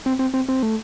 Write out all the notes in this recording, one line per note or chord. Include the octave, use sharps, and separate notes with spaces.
C4
C4
C4
C4
A3